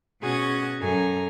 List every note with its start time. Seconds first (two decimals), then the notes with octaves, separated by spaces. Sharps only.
0.22 B2 C#4 F#4 G#4 F#6 G#6
0.80 F#2 A4 G#5 A#5